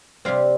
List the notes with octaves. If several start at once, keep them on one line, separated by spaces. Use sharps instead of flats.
C3 G3 C4 F5